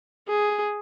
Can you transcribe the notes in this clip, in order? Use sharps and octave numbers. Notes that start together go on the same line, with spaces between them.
G#4